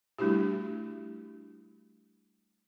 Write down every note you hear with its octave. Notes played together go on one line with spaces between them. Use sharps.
G3 A3 D4 E4 F#4 G4